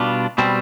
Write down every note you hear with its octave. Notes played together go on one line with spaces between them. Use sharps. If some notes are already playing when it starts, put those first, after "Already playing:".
Already playing: B2 G3 D4 F4
B2 G3 C4